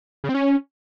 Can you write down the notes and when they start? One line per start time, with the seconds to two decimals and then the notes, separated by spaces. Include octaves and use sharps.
0.24 C#3
0.29 C4
0.34 C#4